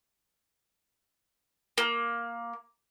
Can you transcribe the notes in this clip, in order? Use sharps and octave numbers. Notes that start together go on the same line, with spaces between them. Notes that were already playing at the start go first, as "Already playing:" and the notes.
A#3